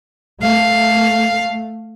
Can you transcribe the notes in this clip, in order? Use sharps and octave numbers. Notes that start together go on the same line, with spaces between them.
A3 F5